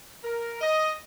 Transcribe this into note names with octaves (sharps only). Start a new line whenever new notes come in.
A#4
D#5